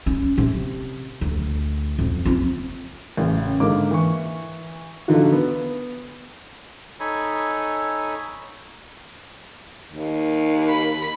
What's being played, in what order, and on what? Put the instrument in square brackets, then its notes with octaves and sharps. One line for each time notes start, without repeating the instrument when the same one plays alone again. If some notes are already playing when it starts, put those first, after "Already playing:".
[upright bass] C#4
C3
D2
F2
C4 F4
[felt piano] A1 C#3
G#2 D3 A#3 D6
E3 C#6
D3 F3 D#4 F#4
B3
[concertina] D#4 A4 C#5 G#5 B5
[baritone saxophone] D#2
[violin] B5